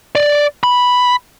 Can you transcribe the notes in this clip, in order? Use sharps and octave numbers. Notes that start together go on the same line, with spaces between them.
D5
B5